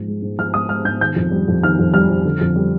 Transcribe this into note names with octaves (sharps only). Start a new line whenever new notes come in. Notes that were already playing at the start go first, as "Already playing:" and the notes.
Already playing: G#2 F3
G#3
G#2
F3 F6
G#2 D#6
G#3 F6
G#2 G6
D#3 G6
F2
G3
F2
D#3 F6
F2
G3 F6
F2
D3
F2
G3